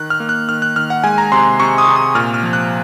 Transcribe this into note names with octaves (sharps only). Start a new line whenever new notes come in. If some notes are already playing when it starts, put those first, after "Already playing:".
Already playing: D#3 F#6
F6
A#3
F#6
D#3 F6
F#6
D#3 F6
F#5
G#3 G#5
A#5
C3 C6
C3 C#6
D#6
C3
D#6
A#2 F6
F6
F3
F#6